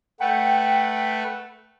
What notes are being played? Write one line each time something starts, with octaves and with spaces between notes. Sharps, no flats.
A3 B4 F#5 G5